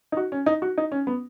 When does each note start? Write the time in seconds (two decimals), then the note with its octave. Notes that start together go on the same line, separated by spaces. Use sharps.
0.12 D#4
0.17 F#4
0.32 C#4
0.46 D#4
0.62 F#4
0.78 D#4
0.92 C#4
1.07 B3